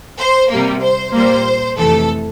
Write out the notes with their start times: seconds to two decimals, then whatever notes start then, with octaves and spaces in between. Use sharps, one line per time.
0.18 C5
0.50 C3 G3 A#3
0.82 C5
1.14 A#2 G3 A#3 C5
1.77 F2 C3 E3 A3 A4